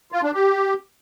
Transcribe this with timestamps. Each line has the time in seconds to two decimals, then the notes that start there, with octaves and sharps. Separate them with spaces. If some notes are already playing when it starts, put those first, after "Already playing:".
0.12 F4
0.23 D4
0.33 G4